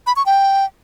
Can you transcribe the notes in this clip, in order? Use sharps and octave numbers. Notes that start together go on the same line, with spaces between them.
B5
C#6
G5